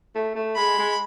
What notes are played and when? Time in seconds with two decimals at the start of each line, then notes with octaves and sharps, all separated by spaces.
0.15 A3
0.35 A3
0.56 G#3 B5
0.79 G#3